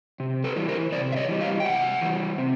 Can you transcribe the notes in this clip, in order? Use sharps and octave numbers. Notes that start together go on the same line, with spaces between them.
C3
A4 B4
E3 G3
A#4 C5
C3 C5 D5
E5
C#5 D#5
E3 G3
D#5 F5
G5
C3 E5 F#5
E3 G3
C3